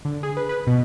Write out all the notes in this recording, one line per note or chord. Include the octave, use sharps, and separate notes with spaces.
D3
G#4
B4
B4
B2